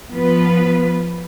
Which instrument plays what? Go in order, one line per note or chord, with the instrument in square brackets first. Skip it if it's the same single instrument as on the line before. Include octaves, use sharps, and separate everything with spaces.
[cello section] F3 B3 F4 B4